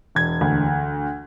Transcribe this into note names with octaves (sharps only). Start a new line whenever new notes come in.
E1 G#6
D2